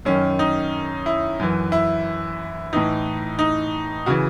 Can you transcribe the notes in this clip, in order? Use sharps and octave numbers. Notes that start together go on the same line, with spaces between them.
F#2 D#3 C#4
D#4
E4
F#2 E3
E4
A2 E3 D#4
D#4
C#3 E3 F#4